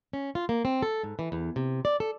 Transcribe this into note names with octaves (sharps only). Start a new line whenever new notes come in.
C#4
F4
A#3
C4
A4
G#2
E3
E2
C3
D5
A4